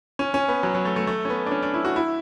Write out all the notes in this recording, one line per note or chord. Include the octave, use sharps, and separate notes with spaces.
C#4
C#4
B3
F#3
F#3
A3
A3
A3
C#4
B3
D4
C#4
D4
E4
F#4
E4